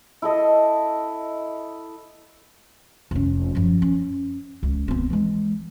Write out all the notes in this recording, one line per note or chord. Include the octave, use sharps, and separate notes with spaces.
E4 A4 D#5
F1 C#4
F#2 F3
C#4
C#2
B3 C4
E3 G#3